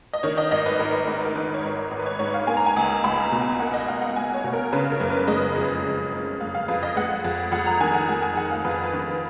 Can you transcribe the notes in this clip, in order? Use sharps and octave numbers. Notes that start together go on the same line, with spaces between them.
D#5
D#3 C#5
D#5
G#1 D#5
B4
G#1 A#4
G#2
A#4
D#3 B4
C#5
G#1
G#1
B4
C#5
G#2 C#5
F5
A#3 G#5
A#5
G#5
C#2
C#2 B5
A#5
B2
G#5
A#3 F#5
D#5
C#2 F5
F#5
C#2 G#5
C#5
B2
A#4
C#3 B4
A#4
F#1
B4
G#3 D#5
F2
C#3
F#1
G#3 F5
F5
F2 B4
D#5
G#3 F#5
F2
F2 F#5
A#5
D#3 G#5
F#5
G#3 G#5
G#5
F2 F#5
F5
F2 B4
B4
D#3